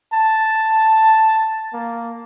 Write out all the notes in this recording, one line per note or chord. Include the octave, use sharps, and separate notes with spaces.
A5
A#3